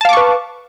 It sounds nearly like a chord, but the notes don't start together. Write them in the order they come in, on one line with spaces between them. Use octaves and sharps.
A5 F5 D6 C#6 B4